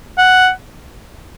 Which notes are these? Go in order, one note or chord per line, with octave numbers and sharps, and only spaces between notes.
F#5